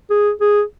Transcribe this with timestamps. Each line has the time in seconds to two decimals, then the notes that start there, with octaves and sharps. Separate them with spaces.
0.10 G#4
0.41 G#4